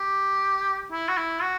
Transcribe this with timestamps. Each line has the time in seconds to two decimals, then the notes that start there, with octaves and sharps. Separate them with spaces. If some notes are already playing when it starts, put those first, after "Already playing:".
Already playing: G4
0.91 E4
1.08 F#4
1.17 E4
1.42 F#4